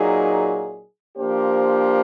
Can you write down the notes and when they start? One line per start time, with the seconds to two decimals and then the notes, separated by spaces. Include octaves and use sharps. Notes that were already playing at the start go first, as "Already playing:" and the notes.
Already playing: A#2 F#3 A#3 D#4 G#4
1.16 F3 A#3 D4 G4 C5